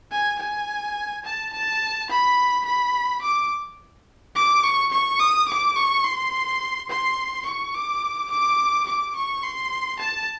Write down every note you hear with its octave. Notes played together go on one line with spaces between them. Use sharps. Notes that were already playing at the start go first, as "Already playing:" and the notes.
G#5
G#5
A5
A5
B5
B5
D6
D6
C#6
C#6
D#6
D6
C#6
C6
C6
C#6
D6
D6
D6
C#6
C6
A5